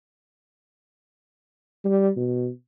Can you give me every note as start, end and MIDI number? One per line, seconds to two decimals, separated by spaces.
1.84 2.10 55
2.17 2.49 47